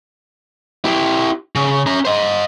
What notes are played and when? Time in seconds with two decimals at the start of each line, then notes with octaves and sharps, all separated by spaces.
0.85 E4 G4
1.55 C#3
1.86 C#4 A#5
2.05 C5 D#5